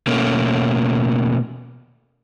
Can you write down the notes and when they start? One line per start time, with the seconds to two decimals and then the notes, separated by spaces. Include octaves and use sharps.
0.07 B2 A3 A#3 C#4